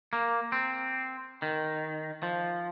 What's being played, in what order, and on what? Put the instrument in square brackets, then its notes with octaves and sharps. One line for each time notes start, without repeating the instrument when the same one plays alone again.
[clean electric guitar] A#3
C4
D#3
F3